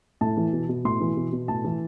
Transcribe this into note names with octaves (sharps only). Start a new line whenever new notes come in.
A2 A5
E3
B2
B2
A2 C6
E3
B2
B2
A2 A5
E3